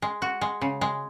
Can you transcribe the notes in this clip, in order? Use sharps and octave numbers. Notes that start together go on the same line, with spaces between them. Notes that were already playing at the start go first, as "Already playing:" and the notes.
G#3
F#4
G#3
C#3
G#3